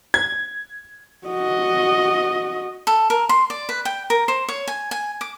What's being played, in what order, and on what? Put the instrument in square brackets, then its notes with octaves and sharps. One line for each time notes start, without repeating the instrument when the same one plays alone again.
[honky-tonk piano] G#6
[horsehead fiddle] F#4 D#5
[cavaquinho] A4
A#4
C6
D5
B4
G5
A#4
C5
C#5
G#5
G#5
D6